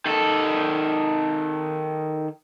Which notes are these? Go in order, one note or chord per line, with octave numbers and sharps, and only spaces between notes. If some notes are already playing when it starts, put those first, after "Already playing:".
D#3 A4